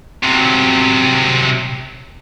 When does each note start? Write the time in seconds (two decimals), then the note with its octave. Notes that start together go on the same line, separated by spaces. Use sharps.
0.23 C3 F#3